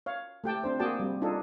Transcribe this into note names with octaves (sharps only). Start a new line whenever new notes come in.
C#5 F5
A3 G4 G5 A5
C4 D4 C5
A#3 F#4 G#4 D5 G5 A5
G3 C4
D4 D#4 F4 G#4 A4